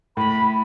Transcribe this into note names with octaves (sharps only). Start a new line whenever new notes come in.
A2 B5